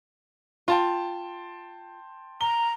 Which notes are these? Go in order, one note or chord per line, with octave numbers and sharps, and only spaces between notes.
F4 G5 A5 C6
A#5 G7